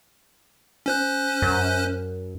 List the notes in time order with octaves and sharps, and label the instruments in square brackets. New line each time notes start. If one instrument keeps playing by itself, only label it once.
[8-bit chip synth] C#4 C5 F#6
[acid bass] F#2